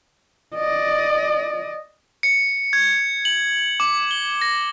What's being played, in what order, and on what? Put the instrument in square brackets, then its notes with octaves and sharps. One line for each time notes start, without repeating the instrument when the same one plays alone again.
[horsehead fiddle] D5 D#5
[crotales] C#7
G#6
F#7
D6
G7
A#6